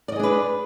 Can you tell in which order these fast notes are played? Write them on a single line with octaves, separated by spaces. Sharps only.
D5 D#5 G#4 D4 B4